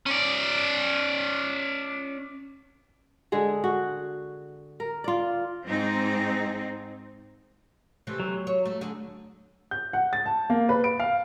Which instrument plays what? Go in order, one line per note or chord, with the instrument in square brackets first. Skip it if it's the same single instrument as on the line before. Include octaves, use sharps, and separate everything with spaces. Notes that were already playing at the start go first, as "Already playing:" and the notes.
[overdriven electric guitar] C#4 D5
[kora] D3 G#3 G#4
F#4
A#4
F4 D5
[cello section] G#2 C4 D#4
[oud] C3 E3 A3
[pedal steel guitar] F#3
[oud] C#5
A3
D3 D4 G#4
[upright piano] G6
F#5
A6
A5
A#3
B4
D7
F5